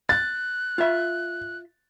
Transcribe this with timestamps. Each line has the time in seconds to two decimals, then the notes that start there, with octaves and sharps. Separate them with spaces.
0.09 F#6 A6
0.78 F4 E5